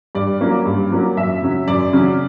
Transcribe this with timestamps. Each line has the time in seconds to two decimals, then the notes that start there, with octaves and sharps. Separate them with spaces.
0.15 G2 D5
0.41 F#3 A#3 C#4
0.65 G2
0.91 F#3 A#3 C#4
1.17 F#2 E5
1.42 C#3 F#3 C#4
1.67 F#2 D5
1.93 C#3 F#3 C#4